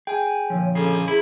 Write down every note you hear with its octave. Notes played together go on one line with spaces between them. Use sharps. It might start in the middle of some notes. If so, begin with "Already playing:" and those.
G#4 G5 G#5
A#2 D3 F3 C#5
C#3 A4 C7
E4 G#4